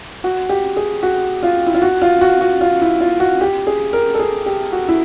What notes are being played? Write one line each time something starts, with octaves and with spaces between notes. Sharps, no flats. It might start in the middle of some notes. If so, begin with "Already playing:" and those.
F#4
G4
G#4
F#4
F4
E4
F4
F#4
F4
F#4
F#4
F4
E4
F4
F#4
G4
G#4
A#4
A4
G#4
G4
F#4
E4